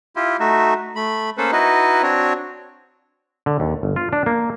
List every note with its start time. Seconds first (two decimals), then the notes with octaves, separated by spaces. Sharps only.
0.16 E4 F4 G4
0.40 A3 D#4 F#4 E5
0.96 A3 B5
1.38 A#3 C#4 A4 B4 C5
1.52 D#4 E4 F#4 B4 D#5
2.02 C4 D4 F#4 C#5
3.46 D3
3.60 D#2
3.83 G1
3.96 F4
4.13 D4
4.26 A#3